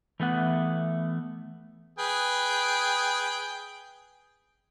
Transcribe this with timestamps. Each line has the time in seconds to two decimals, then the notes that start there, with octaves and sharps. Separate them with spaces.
0.20 E3 A3 B3 F#5
1.99 G#4 B4 G5